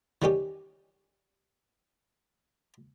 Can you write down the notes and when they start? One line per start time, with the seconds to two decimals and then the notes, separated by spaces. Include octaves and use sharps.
0.22 D#3 G3 C#4 G4